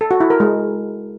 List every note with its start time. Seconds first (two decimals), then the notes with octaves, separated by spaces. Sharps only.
0.01 A4
0.11 F#4
0.20 E4
0.30 A#4
0.40 G#3